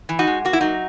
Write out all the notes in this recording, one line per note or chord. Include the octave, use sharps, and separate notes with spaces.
E3
D#4 F#4
G#3
A#3 F#4
E4
F#3 D#4 F#4